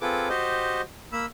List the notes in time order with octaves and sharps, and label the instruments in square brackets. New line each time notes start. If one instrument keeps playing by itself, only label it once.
[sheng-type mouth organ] C4 F4 G#4 A4 B4 D6
F#4 G4 C5 D#5
A#3 B5 E6